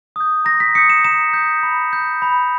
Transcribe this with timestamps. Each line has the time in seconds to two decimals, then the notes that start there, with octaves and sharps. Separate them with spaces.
0.16 D#6 G6
0.45 A#5 A#6
0.60 B6
0.75 D#6 G6 C#7
0.90 E7
1.04 A#5 E7
1.33 D#6 G6
1.63 B5
1.93 G6
2.22 B5